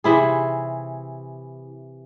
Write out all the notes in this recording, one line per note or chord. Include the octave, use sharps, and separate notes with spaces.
C3 E3 E4 G#4